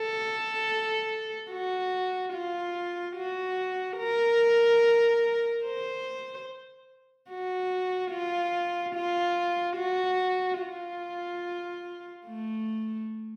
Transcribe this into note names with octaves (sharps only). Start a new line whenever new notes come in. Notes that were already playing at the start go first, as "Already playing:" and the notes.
Already playing: A4
F#4
F4
F#4
A#4
C5
F#4
F4
F4
F#4
F4
A3